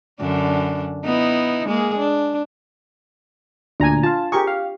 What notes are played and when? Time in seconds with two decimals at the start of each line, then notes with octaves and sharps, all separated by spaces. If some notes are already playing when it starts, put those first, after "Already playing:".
0.20 F#2 D3 D4
1.04 B3 D#4 E4
1.67 G#3 A#3 G#4
1.98 D4
3.80 D2 A#2 D4 G#5 A#5
4.03 F4 F5 A5
4.32 G4 G#4 A#4 C#6
4.47 F5